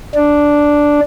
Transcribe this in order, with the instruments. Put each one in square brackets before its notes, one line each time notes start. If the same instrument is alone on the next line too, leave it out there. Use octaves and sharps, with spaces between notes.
[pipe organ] D4